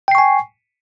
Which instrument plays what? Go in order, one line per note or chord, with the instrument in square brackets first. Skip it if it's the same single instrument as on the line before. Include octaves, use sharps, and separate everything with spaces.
[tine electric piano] G5
C7
C#6
G#5